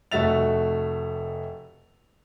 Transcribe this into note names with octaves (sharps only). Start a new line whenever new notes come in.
F1 A3 F#4 E5 A6 F7